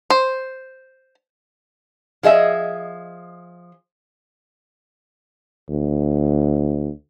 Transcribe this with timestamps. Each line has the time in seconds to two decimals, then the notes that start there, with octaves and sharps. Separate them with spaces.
0.10 C5
2.23 F3 G#4 D#5 E5
5.69 D2